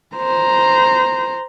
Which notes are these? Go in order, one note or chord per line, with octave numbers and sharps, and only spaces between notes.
C5 A#5